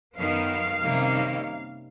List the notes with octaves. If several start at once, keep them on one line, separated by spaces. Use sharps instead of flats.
F#2 D#3 F#3 B3 F5
C3 D#3 G3 A#3 C#4